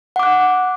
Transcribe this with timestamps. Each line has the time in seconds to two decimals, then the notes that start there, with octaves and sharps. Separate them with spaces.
0.16 F#5
0.19 D6
0.23 F#6